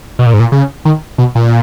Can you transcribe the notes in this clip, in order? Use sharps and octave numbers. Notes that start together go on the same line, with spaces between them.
B2
A#2
G#2
A#2
C#3
D#3
B2
A#2